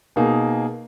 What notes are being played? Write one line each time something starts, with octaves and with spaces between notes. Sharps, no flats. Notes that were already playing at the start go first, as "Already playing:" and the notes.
B2 A#3 D#4 G#4